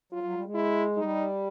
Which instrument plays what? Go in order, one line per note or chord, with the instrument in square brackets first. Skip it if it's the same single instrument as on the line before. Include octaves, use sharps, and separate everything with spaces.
[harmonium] F#3 [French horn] F4
[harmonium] F#3
G3
G#3
[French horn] E4
[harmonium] G3 [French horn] D#4